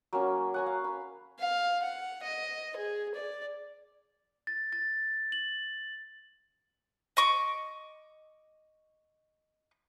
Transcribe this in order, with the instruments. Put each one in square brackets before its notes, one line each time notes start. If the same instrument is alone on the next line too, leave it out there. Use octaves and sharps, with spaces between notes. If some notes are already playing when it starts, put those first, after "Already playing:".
[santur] F#3 A#3 C#4
F#5 G#5 A#5
F5
B5
[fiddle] F5
F#5
D#5
G#4
D5
[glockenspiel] A6
A6
F#7
[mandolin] D#5 C#6 D6